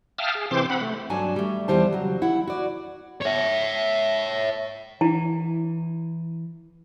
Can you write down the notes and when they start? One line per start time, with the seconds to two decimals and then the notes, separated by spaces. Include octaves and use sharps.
0.18 E5 F5 G5 A5 D#6 F6
0.35 G#4
0.51 C3 E3 C4 C5 C6 D6
0.70 C4 F#5 B5
0.81 A3
1.10 G2 F#3 D4 G#5 A5
1.36 G3 A3
1.68 E2 E3 G3 C5 A5
1.93 C#3 F#3
2.22 E4 F#5
2.47 F#4 D5
3.22 C#5 E5
5.01 E3 E4